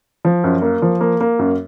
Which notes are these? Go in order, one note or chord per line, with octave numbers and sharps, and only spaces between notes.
F3
F#2
A#3
F3
A#3
A#3
F#2